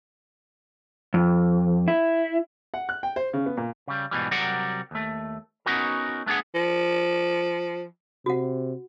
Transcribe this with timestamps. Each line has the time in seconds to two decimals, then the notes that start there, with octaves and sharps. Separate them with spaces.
1.14 F2
1.88 E4
2.74 F#5
2.89 F#6
3.03 G5
3.16 C5
3.33 C#3
3.46 B3
3.57 A#2
3.88 C#3 G3
4.11 G#2 B2 E3 G3
4.31 C3 F#3 G3 A#4 D5 F#5
4.91 D#2 A3
5.66 B3 C#4 D#4 F#4 A#4
6.26 A3 B3 D4 G#4 F#5
6.55 F3
8.26 C3 F#4 F#5